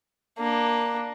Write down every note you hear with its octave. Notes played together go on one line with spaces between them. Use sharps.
A#3 D4